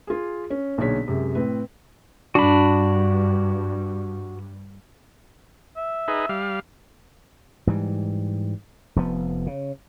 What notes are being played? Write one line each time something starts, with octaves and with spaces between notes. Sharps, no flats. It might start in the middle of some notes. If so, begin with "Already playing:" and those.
F4 G#4
C#4
B1 A#2 D3 G#4 C#5 B6
F#2 C3 G#3
A2 C4 B4
G2 D4 F#4 B5
E5
D#4 G#4 B4
G3 F5
G#2 E3 G3
F1 F3 B3
C#3